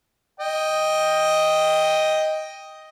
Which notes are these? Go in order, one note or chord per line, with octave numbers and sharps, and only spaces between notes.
D#5 G5